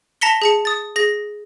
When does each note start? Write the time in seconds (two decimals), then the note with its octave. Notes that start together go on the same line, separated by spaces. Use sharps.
0.21 A5 A#5 A#6 B6 C#7 G7
0.42 G#4 A5 C#7
0.65 D#6 A6
0.96 G#4 A#6